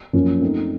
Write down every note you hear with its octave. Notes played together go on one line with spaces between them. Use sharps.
F#2 F3 A#3 C#4
A3 C4 D#4